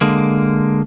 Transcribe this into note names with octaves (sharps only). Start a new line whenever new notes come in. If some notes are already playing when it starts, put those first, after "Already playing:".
D3 G#3 A#3